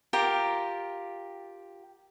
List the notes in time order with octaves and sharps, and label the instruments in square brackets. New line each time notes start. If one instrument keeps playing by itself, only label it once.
[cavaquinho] F4 G4 A#4 G5